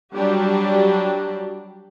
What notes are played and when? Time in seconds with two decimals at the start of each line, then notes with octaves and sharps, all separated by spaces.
0.14 F#3 G3 D4 G4